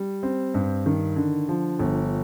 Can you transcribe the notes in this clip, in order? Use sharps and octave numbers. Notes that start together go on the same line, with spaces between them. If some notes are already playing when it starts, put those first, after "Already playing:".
Already playing: G3
C4
G2
D#3
D3
F3
G1